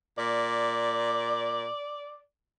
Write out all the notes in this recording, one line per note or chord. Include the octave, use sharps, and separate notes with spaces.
A#2 D5